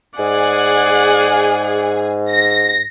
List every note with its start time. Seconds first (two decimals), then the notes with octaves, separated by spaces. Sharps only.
0.19 G#2 G#4 D5 F#5
2.30 A#6